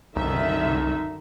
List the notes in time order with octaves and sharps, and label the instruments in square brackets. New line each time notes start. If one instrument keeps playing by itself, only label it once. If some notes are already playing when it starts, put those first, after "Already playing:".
[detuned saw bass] C2 [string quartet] F#2 D3 D#3 [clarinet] D#4 [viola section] E5